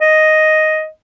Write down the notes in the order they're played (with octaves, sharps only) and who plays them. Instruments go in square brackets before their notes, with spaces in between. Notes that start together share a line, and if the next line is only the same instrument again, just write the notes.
[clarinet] D#5